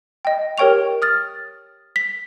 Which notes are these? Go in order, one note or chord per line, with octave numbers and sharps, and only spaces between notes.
D#5 G5
G4 A#4 C#5 G5 C#6 F7
D#6 F6 A6
B6